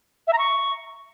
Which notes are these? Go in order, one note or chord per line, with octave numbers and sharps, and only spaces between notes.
E5
A#5
C#6